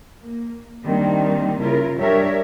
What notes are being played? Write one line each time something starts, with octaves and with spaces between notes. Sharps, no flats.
A#3
D#3 G3 A#3 C4 D4 D#4
C#3 E4 F4 A#4
G3 D4 G4 A#4 C#5 E5